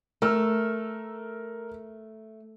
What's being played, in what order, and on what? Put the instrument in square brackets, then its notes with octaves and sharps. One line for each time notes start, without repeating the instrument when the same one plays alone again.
[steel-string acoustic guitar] A3 [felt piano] A#4 E6 F6